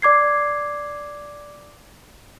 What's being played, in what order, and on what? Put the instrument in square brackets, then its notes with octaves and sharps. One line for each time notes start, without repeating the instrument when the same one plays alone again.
[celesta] D5 D6 G#6 C7